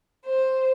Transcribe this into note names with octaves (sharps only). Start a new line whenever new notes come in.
C5